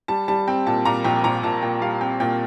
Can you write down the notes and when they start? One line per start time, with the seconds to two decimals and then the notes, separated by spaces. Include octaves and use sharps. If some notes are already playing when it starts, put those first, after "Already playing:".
0.08 G3 A5
0.28 G3 A5
0.48 C4 G5
0.67 A#2 A5
0.85 A#2 A#5
1.04 A#1 G5
1.24 A#1 A#5
1.43 A#2 A5
1.62 A#2 G5
1.82 G3 F5
2.01 C4 G5
2.20 A#2 G5